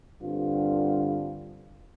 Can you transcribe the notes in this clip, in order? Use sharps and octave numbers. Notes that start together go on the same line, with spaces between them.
G2 D3 G3 C4 F4